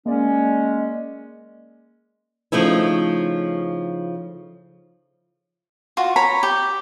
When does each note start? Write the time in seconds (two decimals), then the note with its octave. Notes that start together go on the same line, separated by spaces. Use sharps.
0.06 G#3 A#3 C#4 D5
2.52 C#3 F3 A3 D#4 E4
5.97 F4 F#4
6.16 C#5 A#5 B5
6.43 G4